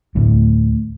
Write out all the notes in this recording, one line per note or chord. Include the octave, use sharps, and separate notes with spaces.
D2 A2